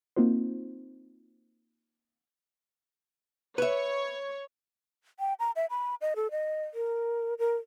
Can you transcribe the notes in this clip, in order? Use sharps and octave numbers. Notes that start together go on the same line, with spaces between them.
A#3 C4 D#4 F4 F#4 C5
B4 C#5 E5
G5
A#5
E5
B5
D#5
A4
D#5
A#4
A#4